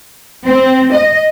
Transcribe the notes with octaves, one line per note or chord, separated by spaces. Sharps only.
C4
D#5